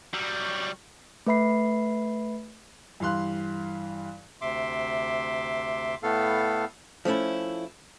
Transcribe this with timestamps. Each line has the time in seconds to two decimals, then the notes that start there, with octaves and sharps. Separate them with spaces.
0.13 F#3 G3
1.27 A3 B4 E5 B5 C7
3.00 G2 E3 F5 C6 F#6
4.41 D2 C3 E5 C6 D6
6.03 A2 A3 B3 A4 F5
7.05 F3 A3 C#4 E4